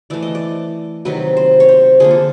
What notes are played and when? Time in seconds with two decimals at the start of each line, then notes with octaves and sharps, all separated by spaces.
0.10 E3 A3 D5
0.22 D#5
0.35 D5
1.05 C3 D#3 F#3 B4
1.37 C5
1.60 C#5
1.69 C5
2.00 D3 F3 A#3 G#4
2.11 A4